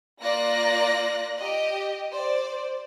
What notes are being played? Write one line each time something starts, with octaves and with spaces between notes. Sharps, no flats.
A#3 F4 D5 F#6 A#6
G4 D#5
C5 D5